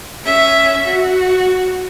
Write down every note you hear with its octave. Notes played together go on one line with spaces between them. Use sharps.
C#4 E5
F#4